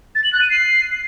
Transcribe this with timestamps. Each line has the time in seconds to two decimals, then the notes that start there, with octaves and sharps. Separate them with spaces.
0.15 A6
0.24 F#7
0.33 F#6
0.41 D#7
0.50 C7